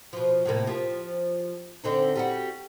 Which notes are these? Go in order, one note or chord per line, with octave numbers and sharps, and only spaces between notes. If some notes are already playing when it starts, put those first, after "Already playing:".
B2 F3
A2 C3 A#3
F3 G4
D3 C4 D#4
G3 D#4 F#4